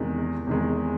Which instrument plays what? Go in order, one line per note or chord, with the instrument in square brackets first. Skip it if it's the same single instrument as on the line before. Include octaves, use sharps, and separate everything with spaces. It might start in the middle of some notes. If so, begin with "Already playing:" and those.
Already playing: [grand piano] E2 C3 D#3 G#3
E2 C3 D#3 G#3